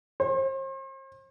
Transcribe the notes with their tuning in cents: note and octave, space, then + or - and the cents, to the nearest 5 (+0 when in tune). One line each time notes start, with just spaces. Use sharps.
C5 +40